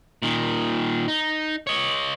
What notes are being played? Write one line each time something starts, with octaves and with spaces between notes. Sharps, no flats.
A#2 D#3
D#4
C#5 D#5